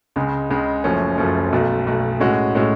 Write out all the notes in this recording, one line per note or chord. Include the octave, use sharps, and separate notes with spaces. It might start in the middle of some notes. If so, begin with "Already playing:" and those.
C#2 C#3 G#3
C#2 C#3 G#3
F#1 F#2 F3 A3 C#4
F#1 F#2 F3 A3 C#4
B1 B2 A3
B1 B2 A3
A2 G#3 C#4 F#4
A2 G#3 C#4 F#4